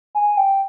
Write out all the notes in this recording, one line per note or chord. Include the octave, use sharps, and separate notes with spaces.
G#5
G5